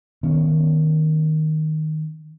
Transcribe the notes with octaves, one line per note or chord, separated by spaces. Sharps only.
D#3 B3 C#4